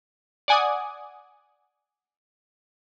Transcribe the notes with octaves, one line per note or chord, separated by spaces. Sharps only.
D5 F#5 G#5 D6 D#6